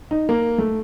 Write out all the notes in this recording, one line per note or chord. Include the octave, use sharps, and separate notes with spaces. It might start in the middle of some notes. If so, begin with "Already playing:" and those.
D#4
A#3
A3